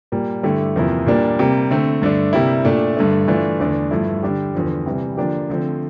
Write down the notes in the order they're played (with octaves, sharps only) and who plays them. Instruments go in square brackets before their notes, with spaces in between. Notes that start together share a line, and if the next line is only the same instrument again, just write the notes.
[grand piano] A#2 G3 A#3
G2 D3 A3 E4 G4
E2 C3 F3 A#3 E4
A#2 G3 A#3 D4
C3 G3 A#3
D3 A3 C4
G2 D3 A3 D4
C3 G3 A#3 E4
A#2 A3 D4
G2 D3 A3
E3 A3 D4 F4
E2 D3 A3 D4
G2 F3 A3 E4
D3 G3 D4 G4
E2 D3 F3
C3 E3 G3
D3 F3 A#3 D4 G4
D3 F3 A3 C4